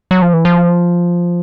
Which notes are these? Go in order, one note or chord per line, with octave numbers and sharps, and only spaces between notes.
F#3
F3
E3
F3